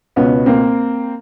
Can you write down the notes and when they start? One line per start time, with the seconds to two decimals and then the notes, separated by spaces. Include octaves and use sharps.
0.16 C#2 B2 B3 C#4
0.46 A#3 C4